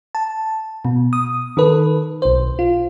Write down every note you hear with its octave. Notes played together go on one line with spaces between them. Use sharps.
A5
B2
D#6
D#3 A4 B4
B1 C5
F4